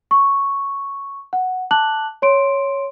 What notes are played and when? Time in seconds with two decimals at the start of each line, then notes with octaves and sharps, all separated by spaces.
0.11 C#6
1.33 F#5
1.71 A5 D6 F#6 F#7
2.22 C#5 C6 D7